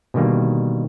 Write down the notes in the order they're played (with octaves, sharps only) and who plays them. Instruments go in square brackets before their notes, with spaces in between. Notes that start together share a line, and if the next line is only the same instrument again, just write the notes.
[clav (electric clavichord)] B2 D3 D#3 G3 A#3